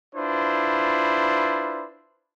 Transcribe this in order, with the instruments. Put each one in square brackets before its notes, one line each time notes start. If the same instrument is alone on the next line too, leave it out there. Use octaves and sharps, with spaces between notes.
[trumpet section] D4 E4 F4 B4 C5